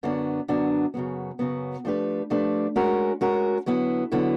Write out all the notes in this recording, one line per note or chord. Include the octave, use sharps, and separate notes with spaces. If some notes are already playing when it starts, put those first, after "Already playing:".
F#2 D3 F#3 B3 D4
F#2 D3 F#3 B3 D4
F#2 C#3 F#3 B3
F#2 C#3 F#3 B3
F3 A3 D4 G4 B4
F3 A3 D4 G4 B4
G#3 C#4 F#4 A#4
G#3 C#4 F#4 A#4
D3 F#3 B3 E4
D3 F#3 B3 E4